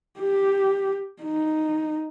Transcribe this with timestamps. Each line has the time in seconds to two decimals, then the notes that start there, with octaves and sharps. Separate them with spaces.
0.19 G4
1.23 D#4